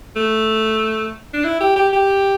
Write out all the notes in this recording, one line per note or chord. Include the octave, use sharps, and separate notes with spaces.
A3
D4
E4
G4
G4
G4